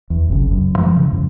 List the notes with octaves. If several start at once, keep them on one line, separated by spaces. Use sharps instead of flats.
E2
F#1 C2 F#2 C#3
F#2
F#2 F3 G#3
C#3 E3
F#2